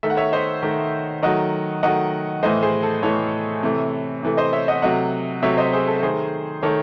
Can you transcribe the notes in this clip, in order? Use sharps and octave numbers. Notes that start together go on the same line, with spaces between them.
D#3 A3 E5
F#5
C#5 E5
C5 D#5
D#3 A3
D#3 F#3 A3 D#5 F#5
D#3 F#3 A3 D#5 F#5
A2 E3 A3 C5 D#5
G#4 C5
A4
A2 E3 A3 A4 C#5
C3 E3 A3
C3 E3 A3
C5 D#5
C#5 E5
D#5 F#5
C3 F#3 A3 D#5 F#5
C3 F#3 A3 C#5 E5
C5 D#5
G#4 C5
A4
D#3 A3 G#4 C5
D#3 A3 A4 C#5